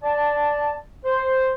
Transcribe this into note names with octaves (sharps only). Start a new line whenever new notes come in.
D5 A5
C5